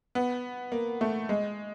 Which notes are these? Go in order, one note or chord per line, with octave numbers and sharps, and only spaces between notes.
B3
A#3
A3
G#3